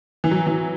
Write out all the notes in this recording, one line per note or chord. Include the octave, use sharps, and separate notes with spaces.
E3
F#3
E3